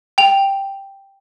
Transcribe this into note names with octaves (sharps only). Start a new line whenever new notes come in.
G5 F7